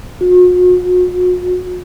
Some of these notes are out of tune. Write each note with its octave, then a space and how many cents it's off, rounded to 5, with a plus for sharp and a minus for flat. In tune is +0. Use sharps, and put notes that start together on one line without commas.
F#4 -40